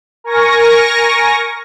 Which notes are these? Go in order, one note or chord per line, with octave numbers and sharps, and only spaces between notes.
A#4 G#5 C#6 A#6